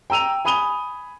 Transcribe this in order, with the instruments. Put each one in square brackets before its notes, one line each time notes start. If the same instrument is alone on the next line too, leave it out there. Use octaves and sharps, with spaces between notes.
[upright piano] G5 A#5 E6 D#7 F7
G#5 B5 D#6 D#7 F7 G7